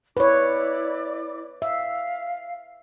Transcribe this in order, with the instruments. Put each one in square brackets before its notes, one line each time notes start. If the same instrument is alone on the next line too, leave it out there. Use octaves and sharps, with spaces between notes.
[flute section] E4 D5 D6 [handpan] B4 C#5
[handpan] E5 [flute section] F5